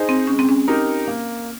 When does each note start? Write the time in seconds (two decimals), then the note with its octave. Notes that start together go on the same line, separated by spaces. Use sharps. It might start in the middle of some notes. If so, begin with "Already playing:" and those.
Already playing: D#4 G#4 C5 D#5
0.09 C4
0.27 G#3 C#4
0.39 C4
0.49 C#4
0.68 D#4 G4 A#4
1.08 A#3